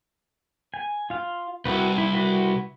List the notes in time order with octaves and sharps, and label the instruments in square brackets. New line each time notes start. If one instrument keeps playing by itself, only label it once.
[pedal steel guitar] G#5
F4 F5
[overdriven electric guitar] C2 [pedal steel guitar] E4 F#4 B4
[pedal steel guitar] E4
E4 F#4 B4